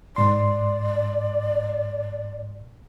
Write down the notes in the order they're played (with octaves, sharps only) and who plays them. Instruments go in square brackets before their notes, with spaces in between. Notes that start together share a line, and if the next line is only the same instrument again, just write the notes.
[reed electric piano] G#2 C6 [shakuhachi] D5